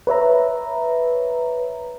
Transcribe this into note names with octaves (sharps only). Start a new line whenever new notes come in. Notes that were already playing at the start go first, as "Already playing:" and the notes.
B4 C#5 E5 A#5